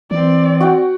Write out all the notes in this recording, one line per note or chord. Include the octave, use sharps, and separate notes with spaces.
E3 C4 D5
F#4 F#5 G5